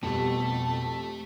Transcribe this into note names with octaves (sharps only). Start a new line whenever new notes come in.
F2 B2 G3 A3 A5